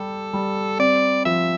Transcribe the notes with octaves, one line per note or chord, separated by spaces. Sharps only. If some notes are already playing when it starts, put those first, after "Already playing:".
Already playing: G3 G4 A4
G3
C4 D5
F3 E5